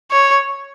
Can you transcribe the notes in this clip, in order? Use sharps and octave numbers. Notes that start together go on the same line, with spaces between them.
C#5